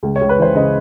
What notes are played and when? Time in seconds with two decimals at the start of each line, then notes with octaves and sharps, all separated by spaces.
0.03 C#2
0.16 C#5
0.21 C#2
0.29 B4
0.38 E3 C5
0.55 C#3 D#5